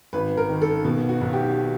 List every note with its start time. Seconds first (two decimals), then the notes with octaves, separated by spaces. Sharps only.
0.13 G#1 B4
0.37 A#4
0.49 D#3
0.62 A4
0.85 B2
1.09 F#4
1.21 B1
1.33 G4